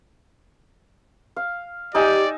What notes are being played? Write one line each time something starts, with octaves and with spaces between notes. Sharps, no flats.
F5
D#4 G4 D5 E5 G#5